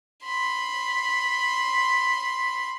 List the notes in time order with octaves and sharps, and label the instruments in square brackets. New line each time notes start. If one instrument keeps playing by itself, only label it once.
[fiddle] B5 C6